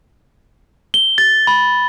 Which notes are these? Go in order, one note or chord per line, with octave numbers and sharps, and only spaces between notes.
G7
A6
B5